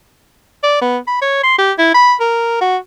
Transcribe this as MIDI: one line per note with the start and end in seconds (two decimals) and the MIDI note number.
0.63 0.81 74
0.81 0.98 59
1.07 1.17 83
1.22 1.42 73
1.43 1.56 84
1.58 1.72 67
1.78 1.92 64
1.94 2.14 83
2.20 2.59 70
2.61 2.77 66